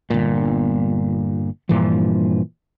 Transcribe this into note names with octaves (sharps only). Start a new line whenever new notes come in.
G1 A#2
G2 A#2 E3 F3